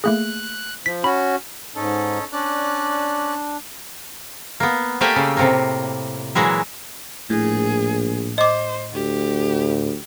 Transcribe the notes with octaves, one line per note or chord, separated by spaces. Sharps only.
A3 A#3 G#4 F#6
F3 B6
C#4 F#4 B5
G#2 C#4 D#4 A4
C#4 D4 D5 F#6
A#3 B3
A3 A#3 G4 D5 E5 G#5
C#3
A2 C3 A#3
A#2 E3 F#3 G#3 E4
A#1 A2 G#4
C5 D#5 D6
D2 G4